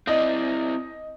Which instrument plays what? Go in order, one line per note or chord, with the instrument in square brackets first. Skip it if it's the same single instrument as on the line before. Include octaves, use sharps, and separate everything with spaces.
[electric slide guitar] C4 E4 D5 [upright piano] D#5